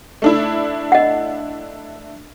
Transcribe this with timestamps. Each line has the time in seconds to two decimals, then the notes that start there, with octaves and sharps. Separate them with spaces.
0.22 A3 D4 E4
0.92 D#5 F#5